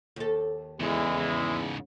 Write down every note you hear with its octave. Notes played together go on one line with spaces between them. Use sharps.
D#2 A4
E2 G#2 C#3 G#3 E4